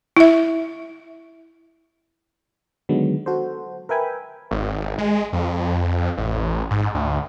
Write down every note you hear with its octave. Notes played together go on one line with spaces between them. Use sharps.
E4 E5
D3 D#3 F#3 G#3 B3
F#4 A4 C5
A#4 B4 E5 G5 G#5 B5
G#1
G#3
F2
A1
G#2
D2